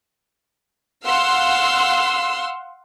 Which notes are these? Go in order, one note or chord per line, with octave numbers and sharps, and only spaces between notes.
F5 F#5 C6 E6